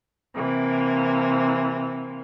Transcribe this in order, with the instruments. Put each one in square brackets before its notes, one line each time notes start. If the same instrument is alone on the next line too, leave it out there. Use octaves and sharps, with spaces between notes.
[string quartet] C3 E3 A#3